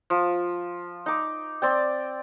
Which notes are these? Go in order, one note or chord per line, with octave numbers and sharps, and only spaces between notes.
F3
D#4 D6
C4 D5 G5